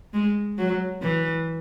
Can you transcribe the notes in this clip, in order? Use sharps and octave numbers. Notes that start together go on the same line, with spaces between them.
G#3
F#3
E3